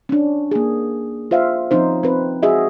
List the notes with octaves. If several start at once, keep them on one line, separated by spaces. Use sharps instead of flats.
C#4 D4
A#3 G#4
F4 C5 E5 F5
F3 C4 C#4 D#4 C5
C4 B4
F#4 G#4 D#5 E5